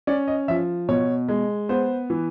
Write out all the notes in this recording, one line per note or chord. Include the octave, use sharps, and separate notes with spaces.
C#4 D5
D#5
F3 E5
B2 C#5
G#3
B3 C5
E3